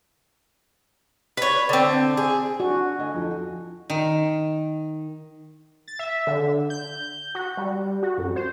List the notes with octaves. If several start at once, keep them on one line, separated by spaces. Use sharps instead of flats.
B4 C#5
D3 C4
G#4
D4 F#4 D5
D2 D#5 G#5
F2 F3
D#3
A6
E5
D3
G6
F#4
G3
F#4
F#2
C5